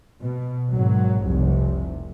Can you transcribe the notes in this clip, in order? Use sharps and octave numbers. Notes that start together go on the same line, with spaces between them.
B2
G#1 F#3
F1 C2 C3